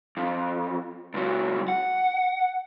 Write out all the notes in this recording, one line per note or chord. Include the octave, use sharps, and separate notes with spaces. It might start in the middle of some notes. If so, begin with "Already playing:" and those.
F2
C#2 F#3
F#5